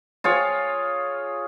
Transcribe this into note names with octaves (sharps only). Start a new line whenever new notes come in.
F4 G#4 C#5